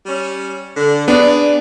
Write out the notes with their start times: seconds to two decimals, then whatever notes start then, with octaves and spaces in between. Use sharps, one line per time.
0.06 G3 C#4
0.76 D3
1.08 B3 D4 G#4 D5